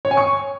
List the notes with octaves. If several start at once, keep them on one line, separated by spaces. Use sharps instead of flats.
C#5
G#5
C#6